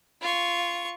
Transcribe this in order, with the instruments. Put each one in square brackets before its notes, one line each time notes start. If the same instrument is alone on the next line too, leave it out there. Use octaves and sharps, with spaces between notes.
[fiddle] F4 C#6